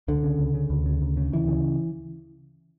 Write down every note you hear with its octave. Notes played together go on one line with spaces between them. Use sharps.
C#2 D3
C#3
C#2
C#3
D2
C#3
D2
C#3
D2 E3
C#3